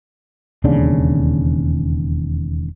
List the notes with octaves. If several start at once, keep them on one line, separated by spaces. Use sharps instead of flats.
E1 D#2 C#3 D4